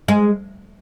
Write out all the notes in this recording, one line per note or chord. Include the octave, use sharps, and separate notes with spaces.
G#3